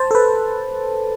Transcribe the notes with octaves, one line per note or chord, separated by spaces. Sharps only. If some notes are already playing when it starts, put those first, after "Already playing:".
Already playing: C5 A5
A4
B4